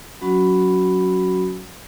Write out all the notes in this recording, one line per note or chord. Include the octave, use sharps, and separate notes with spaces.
F#3 C#4 F#4 B5